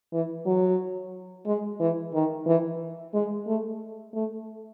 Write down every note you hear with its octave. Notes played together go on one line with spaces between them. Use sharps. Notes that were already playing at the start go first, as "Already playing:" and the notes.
E3
F#3
G#3
E3
D#3
E3
G#3
A3
A3